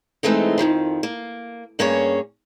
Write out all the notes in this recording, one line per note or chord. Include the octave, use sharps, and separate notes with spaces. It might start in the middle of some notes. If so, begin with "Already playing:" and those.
E3 G#3 A3 C4 D#4
F2 G#2 D#3 F3
A#3
G2 A#3 C#4 G#4 C#5